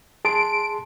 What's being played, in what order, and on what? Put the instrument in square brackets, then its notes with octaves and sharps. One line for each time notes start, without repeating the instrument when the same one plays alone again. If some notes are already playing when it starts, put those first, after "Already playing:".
[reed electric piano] G#4 A5 C6 [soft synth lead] D7